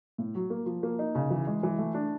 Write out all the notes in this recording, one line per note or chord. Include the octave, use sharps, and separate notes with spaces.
A2
F#3
A#3
F3
A#3
D#4
C#3
E3
G#3
E3
A3
D4